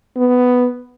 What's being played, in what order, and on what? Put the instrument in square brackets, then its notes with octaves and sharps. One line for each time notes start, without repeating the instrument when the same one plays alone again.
[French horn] B3